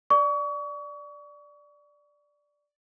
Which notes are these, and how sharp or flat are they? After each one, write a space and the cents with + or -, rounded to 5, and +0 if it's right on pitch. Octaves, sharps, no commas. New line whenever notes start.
D5 +0 C#6 +35